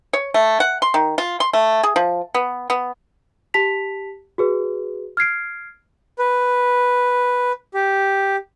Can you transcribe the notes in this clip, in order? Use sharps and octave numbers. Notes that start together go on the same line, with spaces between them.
C#5
A3
F#5
C6
D#3
F4
C6
A3
G#4
F3
B3
B3
G4 A5 B6 F7
F#4 G#4 B4
F6 G#6 C7 D7
B4
G4